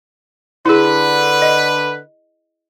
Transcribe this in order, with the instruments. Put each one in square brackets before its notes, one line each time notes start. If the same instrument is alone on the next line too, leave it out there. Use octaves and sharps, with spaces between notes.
[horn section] D3 B4 [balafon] E4 G#4
[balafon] D#5